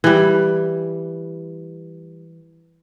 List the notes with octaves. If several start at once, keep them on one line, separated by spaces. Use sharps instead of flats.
E3 G3